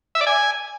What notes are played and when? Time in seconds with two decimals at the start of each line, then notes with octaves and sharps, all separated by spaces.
0.15 E5
0.21 D5
0.27 G#5